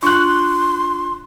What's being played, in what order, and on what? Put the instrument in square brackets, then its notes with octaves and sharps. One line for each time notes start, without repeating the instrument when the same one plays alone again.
[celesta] D4 F4 [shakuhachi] C6 [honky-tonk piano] C#6 F#6